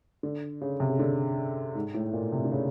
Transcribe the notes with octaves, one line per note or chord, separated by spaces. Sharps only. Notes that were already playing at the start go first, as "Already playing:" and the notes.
D3
C#3
C3
C#3
D3
G#2
A2
A#2
C3
D3
C#3